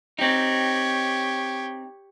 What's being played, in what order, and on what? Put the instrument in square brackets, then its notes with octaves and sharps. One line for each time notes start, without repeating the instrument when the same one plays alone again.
[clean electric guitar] C4 D#4 [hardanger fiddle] G4 C#5